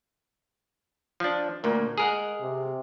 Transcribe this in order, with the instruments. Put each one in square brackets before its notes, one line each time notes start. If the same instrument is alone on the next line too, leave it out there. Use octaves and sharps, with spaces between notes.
[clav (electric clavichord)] F3 D4
[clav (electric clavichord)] D2 A#2 [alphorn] A#4
[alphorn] G#3 [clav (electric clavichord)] G#4 A#4 F#5
[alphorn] C3